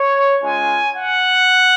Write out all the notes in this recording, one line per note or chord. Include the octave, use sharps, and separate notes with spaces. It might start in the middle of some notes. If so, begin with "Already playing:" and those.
Already playing: C#5
G#3 C#4 F4 G#5
F#5